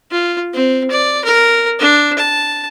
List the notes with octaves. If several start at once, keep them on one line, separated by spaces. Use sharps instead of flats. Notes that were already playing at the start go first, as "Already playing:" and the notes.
F4
C4
D5
A#4
D4
A5